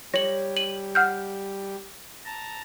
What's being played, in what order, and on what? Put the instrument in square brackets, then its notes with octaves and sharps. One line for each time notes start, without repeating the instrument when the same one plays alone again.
[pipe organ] G3 G4 [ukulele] C#5 [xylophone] A#6 F#7
[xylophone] D#7 F#7
F#5 F6 G6
[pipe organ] A5 A#5